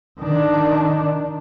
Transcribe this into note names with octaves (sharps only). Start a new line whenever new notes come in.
D#3 D4